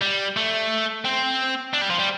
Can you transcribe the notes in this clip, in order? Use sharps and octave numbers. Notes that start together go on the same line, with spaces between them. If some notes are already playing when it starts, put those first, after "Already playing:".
G3
A3
C4
D4
G3
F3
G3